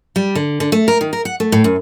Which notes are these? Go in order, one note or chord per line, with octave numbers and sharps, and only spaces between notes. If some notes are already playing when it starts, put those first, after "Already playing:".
G3
D3
D3
A3
A#4
D#3
A#4
F#5
A3
A2
F#2